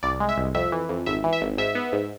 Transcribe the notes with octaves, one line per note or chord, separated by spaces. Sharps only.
C2 D5
G#3
E5
C2
F2 E5
E3
F2
G#1 E5
E3
E5
G#1
G#2 E5
B3
G#2